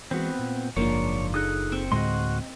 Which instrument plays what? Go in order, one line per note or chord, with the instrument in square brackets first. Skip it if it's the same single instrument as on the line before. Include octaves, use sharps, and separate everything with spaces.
[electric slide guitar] E3 G#3 F#4 [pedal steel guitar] B3 C4 [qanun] B4
[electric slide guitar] A#2
[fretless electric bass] F#1 [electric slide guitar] G#2 F3 A#4 [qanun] A#3 D4 F4 [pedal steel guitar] C#5
[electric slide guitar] D#4 G#4 A4 [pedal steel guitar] D#6 E6 F#6
[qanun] C4 C#6
[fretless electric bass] D2 A2 G#3 [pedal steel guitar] F#4 C6 [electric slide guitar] D#5